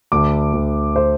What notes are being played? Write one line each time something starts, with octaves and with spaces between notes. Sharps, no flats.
D2 D6
D2
C5